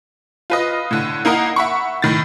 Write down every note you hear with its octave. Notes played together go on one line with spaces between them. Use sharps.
F4 B4 D#5
A2 D3
A#3 D#4 E4 A#4 D#5 F#5
E5 F#5 B5 C#6
A2 D#3 A6